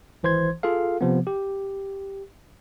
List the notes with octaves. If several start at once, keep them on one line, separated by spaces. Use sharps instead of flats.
G#1 E3 C5 C6 G#6
F4 G#4 A4 F5
C3 F3 B3
G4